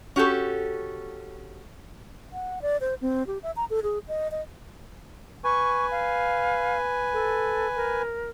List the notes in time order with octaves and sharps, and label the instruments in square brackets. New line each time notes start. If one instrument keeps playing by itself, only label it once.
[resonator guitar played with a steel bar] C#4 F#4 G4 A4
[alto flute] F#5
D5
C5
C4
G4
E5
A#5
A4
G#4
D#5
D#5
[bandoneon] B4 G#5 [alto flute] C#6
[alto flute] F5
A4
A#4